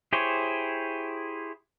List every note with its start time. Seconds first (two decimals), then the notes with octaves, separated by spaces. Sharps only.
0.13 E4 G4 G#4 C5 C#5